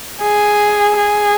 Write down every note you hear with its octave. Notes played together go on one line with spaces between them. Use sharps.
G#4
G#4